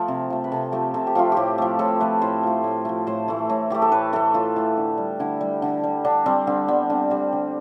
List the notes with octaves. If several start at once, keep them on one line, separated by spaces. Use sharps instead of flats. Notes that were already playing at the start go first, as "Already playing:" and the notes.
Already playing: F3 A3
C3
F3 A3
B4
C3 A4
F3 A3 G4
C3 A4
G4
F3 A3 F4
A2 G4
F3 A3
A2 A4
F3 A3 B4
A2 C5
F3 A3
A2
F3 A3
A2 C5
E3 A3
A2
E3 A3 G4
A4
A2 B4
E3 A3 A4
A2 F4
E3 A3
D3
G3
D3 E4
G3
D3
G3
D3 D4
G3 C4
D3 C4
G3 B3
D3 C4
G3 C4
D3